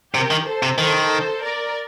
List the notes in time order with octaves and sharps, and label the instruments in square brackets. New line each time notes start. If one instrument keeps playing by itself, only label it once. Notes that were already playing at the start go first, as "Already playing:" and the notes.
[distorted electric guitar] C3 [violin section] G4 A#4
[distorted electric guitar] D#3
[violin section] A4 C5
[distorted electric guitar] C3
[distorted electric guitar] D#3 [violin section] A4 C5
[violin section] A#4 D5